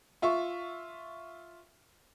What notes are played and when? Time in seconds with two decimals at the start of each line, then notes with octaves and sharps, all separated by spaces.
0.22 F4 E5 C#6